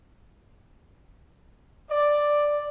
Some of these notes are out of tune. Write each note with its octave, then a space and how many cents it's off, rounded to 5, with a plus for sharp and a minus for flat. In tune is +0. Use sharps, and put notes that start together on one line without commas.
D5 +5